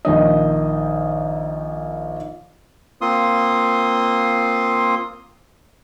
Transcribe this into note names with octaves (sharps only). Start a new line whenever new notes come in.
A#1 D#3 D#5
A#3 C4 F4 C6 D#6